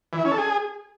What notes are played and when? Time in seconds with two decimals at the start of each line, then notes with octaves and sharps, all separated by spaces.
0.13 E3
0.19 E4
0.25 C#4
0.31 A4
0.37 G#4